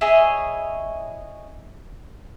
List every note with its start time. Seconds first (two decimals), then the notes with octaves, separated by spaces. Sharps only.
0.01 E4 G#4 C#5 D#5